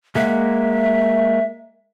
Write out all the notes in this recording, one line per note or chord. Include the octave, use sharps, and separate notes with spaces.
G#3 A#3 E5 F#5